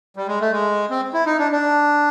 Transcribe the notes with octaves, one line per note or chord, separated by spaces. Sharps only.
G3
G#3
A3
G#3
C4
E4
D#4
D4
D4